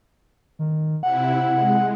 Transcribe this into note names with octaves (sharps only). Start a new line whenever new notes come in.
D#3
C3 E4 F#5
G#3